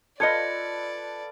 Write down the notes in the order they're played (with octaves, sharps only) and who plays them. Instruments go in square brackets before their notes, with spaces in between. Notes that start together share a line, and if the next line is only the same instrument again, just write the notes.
[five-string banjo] F4 D#5 [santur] A4 B4 F5 [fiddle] D5 [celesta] G#6 C#7